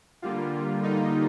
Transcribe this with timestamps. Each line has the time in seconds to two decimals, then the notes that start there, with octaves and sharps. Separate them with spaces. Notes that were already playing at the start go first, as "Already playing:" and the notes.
0.22 D3 G3 A#3 F4
0.83 D#4